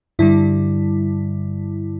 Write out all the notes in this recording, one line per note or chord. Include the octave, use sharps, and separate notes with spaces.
G2 D3 G3 E4